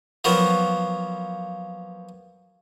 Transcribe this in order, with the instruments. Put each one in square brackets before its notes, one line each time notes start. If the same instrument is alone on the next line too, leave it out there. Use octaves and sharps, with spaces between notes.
[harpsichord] F3 F#3 A#3 B3